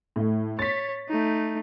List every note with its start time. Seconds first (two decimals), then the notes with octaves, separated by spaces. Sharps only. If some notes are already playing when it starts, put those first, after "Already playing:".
0.16 A2 A3
0.59 C#5 A6 B6
1.09 A3 D#4